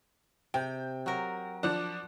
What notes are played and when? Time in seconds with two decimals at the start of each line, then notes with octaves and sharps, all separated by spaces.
0.54 C3 G5
1.06 F#3 A#4
1.63 F3 D4 F#5